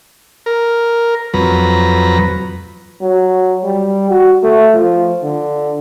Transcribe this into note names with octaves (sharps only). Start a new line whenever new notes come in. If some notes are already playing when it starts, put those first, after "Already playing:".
A#4
F2 F#3 B4 A#5
F#3
G3
F#4
A3
F3
D3